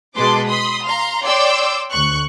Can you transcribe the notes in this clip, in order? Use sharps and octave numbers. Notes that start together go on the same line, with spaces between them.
B2 G#3 B4 A5 C6 D6
B5 C6 D#6
F5 A#5 C6
C#5 D5 G5 C6 D6 E6
D2 C#6 F#6